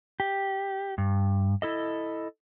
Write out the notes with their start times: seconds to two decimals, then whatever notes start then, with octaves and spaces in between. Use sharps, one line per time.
0.20 G4
0.98 G2
1.62 E4 A4 D#5